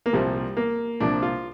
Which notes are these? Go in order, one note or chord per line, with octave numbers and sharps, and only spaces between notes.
A#3
C2 A#2 F3 G3
A#3
C2 A#2 F3 D4
F4